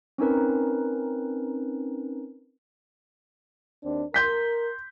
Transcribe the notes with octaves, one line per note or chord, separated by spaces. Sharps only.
C4 C#4 D#4 A#4 B4
D#2 C4 D4
A#4 C6 G6 B6